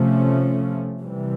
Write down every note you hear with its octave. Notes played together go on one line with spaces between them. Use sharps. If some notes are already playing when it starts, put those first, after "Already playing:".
Already playing: C3 F3 A3 C#4
C3 E3 G3